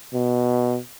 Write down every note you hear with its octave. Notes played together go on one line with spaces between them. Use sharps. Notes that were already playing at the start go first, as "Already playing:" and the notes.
B2